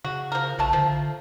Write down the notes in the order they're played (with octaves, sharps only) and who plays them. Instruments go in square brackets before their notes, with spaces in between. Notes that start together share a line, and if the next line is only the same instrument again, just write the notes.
[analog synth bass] C#3 [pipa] F#4
[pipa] F3 A#4
[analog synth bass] A#1 [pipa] C3 A3 A5
[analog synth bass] D3 [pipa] F3